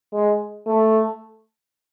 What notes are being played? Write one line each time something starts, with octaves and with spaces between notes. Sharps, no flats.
G#3
A3